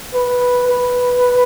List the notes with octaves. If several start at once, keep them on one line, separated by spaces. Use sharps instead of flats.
B4
B4